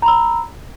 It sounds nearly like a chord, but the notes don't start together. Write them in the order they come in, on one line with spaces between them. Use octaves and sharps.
A#5 B5 E6